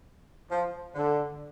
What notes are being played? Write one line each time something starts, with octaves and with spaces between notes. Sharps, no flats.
F3
D3